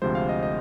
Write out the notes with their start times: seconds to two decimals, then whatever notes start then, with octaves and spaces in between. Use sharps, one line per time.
0.02 D2 C3 F3 G#3 C5
0.15 F5
0.29 D#5
0.43 D#5